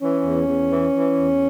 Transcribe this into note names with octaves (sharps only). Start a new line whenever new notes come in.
E3 C#4
E2
E2
E3
E3
E2